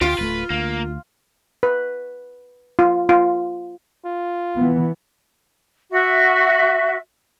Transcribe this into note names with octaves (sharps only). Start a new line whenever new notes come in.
D2 F4 G4
D1 G#3 A3 B4
D2 A#3
B4
F4
F4
F4
E3 B3
F#4 E5